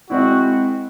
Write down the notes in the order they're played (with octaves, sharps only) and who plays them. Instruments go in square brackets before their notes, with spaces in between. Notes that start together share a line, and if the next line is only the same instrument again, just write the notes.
[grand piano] G#3 C4 E4 [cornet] F#4